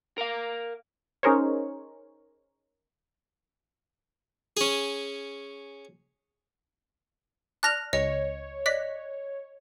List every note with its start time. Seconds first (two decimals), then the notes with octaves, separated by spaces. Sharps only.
0.18 A#4 F5
1.23 C#4 D#4 G#4 A#4 C5 C#5
4.57 C#4 G#4
7.63 D5 A5 F6 F#6 A#6 F7
7.93 C#2 C#5 D#5
8.66 D5 D#5 F#6 B6